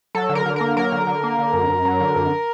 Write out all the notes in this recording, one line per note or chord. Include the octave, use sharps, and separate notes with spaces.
F#3 A4
D3
A#4
D3
A#3 A#4
F#3 A#4
D3
D3
A#3
D3
F#2
F#2
F#3
D3
F#2